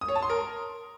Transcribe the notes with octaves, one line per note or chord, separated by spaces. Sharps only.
D#6
C#5
A5
C6
A#4